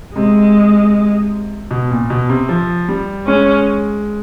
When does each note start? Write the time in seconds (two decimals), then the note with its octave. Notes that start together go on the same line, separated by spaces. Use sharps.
0.15 C3 G#3
1.71 B2
1.91 A#2
2.10 B2
2.29 C3
2.49 F3
2.89 G3
3.27 G#3 C#4